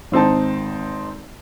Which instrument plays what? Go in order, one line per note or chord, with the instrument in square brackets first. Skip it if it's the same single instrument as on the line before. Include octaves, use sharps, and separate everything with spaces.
[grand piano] G#1 C4 D#4 A5